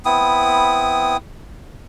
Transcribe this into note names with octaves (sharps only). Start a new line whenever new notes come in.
B3 C4 E4 D#6